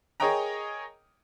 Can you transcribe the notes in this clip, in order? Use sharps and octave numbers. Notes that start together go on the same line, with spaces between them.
G#4 A#4 C#5 D#5 G5 A#5